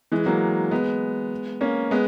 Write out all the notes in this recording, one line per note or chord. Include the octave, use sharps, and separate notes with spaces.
E3 G#3
F#3 A#3
G#3 B3
A#3 C#4
G#3 B3